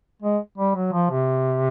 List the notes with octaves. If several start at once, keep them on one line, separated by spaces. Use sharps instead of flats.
G#3
G3
F#3
F3
C3